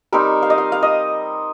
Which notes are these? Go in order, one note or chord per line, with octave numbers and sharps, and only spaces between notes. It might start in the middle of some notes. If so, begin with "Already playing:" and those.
G3 C4 D#4 A#4
F5
D#5
F5
F5
D#5